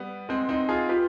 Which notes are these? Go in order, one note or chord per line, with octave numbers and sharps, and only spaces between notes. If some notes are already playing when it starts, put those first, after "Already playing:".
Already playing: G3 B3
G#3 C4
C4 D#4
F4 G#4
F4 G4 B4